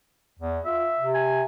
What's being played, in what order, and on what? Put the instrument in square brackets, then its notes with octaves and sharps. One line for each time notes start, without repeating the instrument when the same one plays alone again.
[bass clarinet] E2
[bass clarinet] F4 [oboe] E5
[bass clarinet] C3
[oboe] G#5